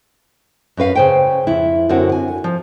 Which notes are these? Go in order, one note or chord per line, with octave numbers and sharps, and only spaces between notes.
F#2 C#4 B4 F5
C#3 C5 G5
F2 E4
F#2 D3 C4 F#4
G#5
F3